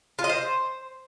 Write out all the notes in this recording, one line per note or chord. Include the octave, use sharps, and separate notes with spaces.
F4
D#5
C5